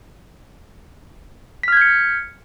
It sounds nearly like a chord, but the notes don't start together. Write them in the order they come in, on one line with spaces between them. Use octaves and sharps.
B6 F6 G#6 G6 C#7